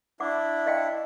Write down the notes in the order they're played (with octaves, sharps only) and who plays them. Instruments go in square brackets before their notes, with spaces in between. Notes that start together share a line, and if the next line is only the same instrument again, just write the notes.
[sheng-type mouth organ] D4 E4 [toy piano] F#5 D6
[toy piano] D#5 F5 G5